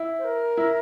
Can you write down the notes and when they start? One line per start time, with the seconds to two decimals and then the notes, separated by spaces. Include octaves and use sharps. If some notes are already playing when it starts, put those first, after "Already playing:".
Already playing: E4
0.18 C5
0.24 A#4
0.57 E4